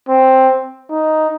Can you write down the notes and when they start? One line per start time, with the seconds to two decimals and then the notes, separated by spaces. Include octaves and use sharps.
0.09 C4
0.91 D#4